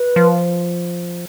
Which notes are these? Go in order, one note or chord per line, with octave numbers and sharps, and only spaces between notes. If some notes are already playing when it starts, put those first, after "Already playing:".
Already playing: B4
F3